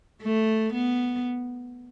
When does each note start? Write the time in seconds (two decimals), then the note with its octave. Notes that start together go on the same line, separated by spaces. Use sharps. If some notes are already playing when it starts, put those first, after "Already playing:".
0.23 A3
0.73 B3